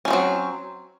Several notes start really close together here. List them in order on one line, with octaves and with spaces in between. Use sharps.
C#4 G3 C4 F#3